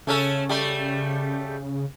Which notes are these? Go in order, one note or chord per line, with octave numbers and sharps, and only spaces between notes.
C#3 A3 C#4 A4
G3 A3